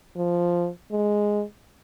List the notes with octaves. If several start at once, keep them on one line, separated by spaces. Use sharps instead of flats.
F3
G#3